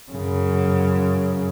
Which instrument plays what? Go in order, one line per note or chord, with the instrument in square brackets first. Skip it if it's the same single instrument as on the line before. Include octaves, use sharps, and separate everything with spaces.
[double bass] F#2 C#3